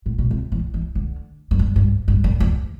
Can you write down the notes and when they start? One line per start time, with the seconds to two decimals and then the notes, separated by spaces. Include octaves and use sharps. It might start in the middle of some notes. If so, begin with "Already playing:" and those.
0.06 A2
0.18 B2
0.31 C3
0.52 E3
0.74 E3
0.95 D3
1.51 F#2
1.59 G2
1.76 G2
2.08 G2
2.24 F#2
2.40 E2